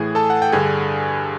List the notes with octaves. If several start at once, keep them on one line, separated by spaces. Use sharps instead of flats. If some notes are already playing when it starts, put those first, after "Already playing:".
Already playing: A2 E3 G#4 G#5
A4 A5
F#5
G5
G2 D3 G#4 G#5